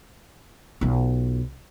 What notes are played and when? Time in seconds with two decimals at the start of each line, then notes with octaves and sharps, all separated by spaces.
0.81 B1 F4